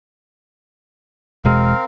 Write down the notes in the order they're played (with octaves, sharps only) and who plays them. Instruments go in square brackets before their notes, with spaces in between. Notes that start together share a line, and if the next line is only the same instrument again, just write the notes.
[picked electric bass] E1 B2 G#3 [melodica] C4 A#4 F5